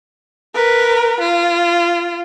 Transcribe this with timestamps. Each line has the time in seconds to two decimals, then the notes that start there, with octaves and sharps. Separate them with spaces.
0.55 A#4 B4
1.20 F4